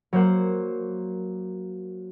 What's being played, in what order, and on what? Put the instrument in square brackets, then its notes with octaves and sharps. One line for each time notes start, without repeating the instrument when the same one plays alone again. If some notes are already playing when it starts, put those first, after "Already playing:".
[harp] F#3 A#3 C5 F#5